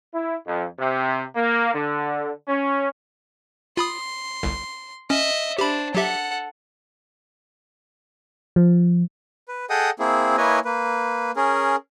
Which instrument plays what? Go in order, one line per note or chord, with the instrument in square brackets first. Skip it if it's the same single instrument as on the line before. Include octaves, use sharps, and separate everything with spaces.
[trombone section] E4
F2
C3
A#3
D3
C#4
[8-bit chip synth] F4 B5 D#6 [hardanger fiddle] C6
[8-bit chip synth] G1 C2
[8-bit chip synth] C#4 [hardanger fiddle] D#5 E5
[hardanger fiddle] D4 C5 [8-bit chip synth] G4 B5
[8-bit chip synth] F#3 G4 E5 [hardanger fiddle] A4 F#5
[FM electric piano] F3
[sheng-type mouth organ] B4
G#4 A4 D#5 F#5 G5 D#6
A#3 C4 E4 G#4
A#3 E4 B4 C#5 D#5 G#5
A#3 B4
C#4 G#4 A#4